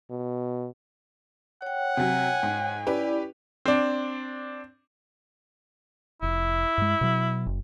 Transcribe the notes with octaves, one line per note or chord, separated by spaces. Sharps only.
B2
C#5 F#5 G5
C3 F#3 G#5
G#2
C#4 E4 G4 B4 D5
C4 D4
F1 E4
G2 G#3
B2 F#3
F#1